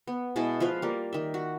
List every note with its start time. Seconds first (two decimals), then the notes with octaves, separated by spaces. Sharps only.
0.07 B3
0.36 B2 G#3 E4 A5
0.60 F3 F4 B4 F5
0.82 G3 A#3
1.13 D#3 E5
1.34 F#4